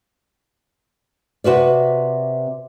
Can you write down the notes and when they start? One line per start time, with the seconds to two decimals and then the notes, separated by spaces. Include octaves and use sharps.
1.44 C3 F#4 B4 D5